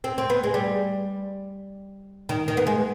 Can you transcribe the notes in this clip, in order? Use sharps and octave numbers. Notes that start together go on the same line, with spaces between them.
C4
C4
B3
G#3
G3
D#3
D#3
B3
G#3